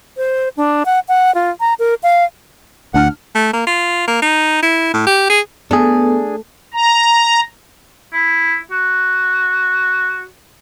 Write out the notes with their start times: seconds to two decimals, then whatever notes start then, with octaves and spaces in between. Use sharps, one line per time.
0.17 C5
0.57 D4
0.86 F#5
1.08 F#5
1.35 F4
1.60 A#5
1.79 A#4
2.03 F5
2.94 D2 A2 D4 F#5 F6
3.35 A3
3.53 A#3
3.67 F4
4.08 A#3
4.22 D#4
4.62 E4
4.93 A2
5.07 G4
5.30 G#4
5.71 A3 B3 D4 G#4
6.73 A#5
8.13 E4
8.71 F#4